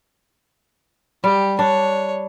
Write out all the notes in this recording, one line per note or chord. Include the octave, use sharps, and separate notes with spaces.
G3 G4
D4 C#5